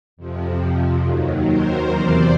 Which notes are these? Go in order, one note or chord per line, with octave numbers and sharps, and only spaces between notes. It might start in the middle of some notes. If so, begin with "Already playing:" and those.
F2 C3 F3
D#2 D#3 F#3
A#4 C5
E2 C3 E3 C5 D5